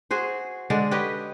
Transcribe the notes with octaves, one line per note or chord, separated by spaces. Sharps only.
F#4 G#4 C5
D3 G#3 D4
G4 B4 C#5 D#5